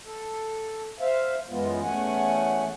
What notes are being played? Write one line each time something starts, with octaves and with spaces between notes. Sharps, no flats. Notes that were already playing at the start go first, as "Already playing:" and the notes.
A4
C5 E5 F5
F#2 E3 G#3 B3 F4
E2 A3 C#4 F#5 G#5